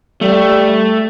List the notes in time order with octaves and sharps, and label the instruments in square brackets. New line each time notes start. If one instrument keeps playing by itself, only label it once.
[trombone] G3 [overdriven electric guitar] A3